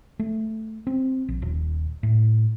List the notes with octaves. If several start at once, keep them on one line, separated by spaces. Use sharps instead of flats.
A3
C4
A#1
D#1
A2